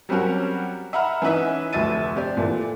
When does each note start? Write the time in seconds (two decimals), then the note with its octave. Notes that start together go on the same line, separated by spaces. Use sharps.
0.09 F#3 G3 C4 C#4 F#4 A#4
0.93 E5 F#5 A#5 B5 F6
1.22 E3 C#4 D#4 B4 D#5 E5
1.73 F1 D2 E5 A6 D#7
2.15 C4 G4 D5
2.37 A#2 E3 A3